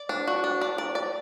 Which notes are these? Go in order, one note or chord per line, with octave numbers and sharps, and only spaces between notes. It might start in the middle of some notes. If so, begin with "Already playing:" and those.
Already playing: D5
D4
F#4
D4
D5
D5
D5